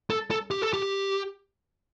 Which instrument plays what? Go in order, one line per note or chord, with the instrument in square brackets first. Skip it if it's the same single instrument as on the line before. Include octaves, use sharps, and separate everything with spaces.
[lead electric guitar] A4
A4
G4
A4
G4